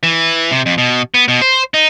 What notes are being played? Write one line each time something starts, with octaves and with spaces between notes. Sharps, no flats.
E3
C3
F2
B2
B3
B2
C5
D#4